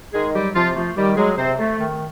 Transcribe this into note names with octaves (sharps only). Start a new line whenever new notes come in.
D#3 G#3 G#4
F#3 G3 G4
C3 F3 F4
F3 A3 F4
D#3 G3 G4
F#3 G#3 G#4
C3 C4 C5
A3
D#3